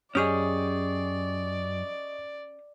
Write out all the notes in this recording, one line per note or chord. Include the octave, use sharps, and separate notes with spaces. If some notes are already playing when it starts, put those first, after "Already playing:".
F#2 C#4 G4 G#4 D5 D#5 C#6 D#6